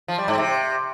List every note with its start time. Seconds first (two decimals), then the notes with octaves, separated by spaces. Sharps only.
0.08 F3
0.18 G3
0.28 G#2
0.38 C3